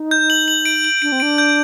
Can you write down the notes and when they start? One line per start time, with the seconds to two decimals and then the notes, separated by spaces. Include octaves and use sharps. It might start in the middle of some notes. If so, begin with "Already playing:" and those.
Already playing: D#4
0.11 G6
0.30 F#7
0.48 F#7
0.65 D7
0.85 F#7
1.02 D4 D7
1.12 C4
1.20 D4 D7
1.38 G6